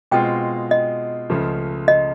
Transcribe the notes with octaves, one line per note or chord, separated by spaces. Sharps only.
B2 G#3 C4 F4 G5
D#5
C#2 C#3 F3 A3
D#5